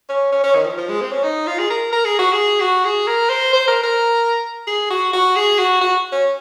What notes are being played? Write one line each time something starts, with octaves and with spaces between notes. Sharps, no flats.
C#4
C#4
C#4
D#3
F3
F3
G#3
C4
C#4
D#4
F4
G#4
A#4
A#4
G#4
F#4
G#4
F#4
G#4
A#4
C5
C5
A#4
A#4
G#4
F#4
F#4
G#4
F#4
F#4
C#4